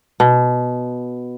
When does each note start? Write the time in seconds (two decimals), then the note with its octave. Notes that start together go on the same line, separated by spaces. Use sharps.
0.20 B2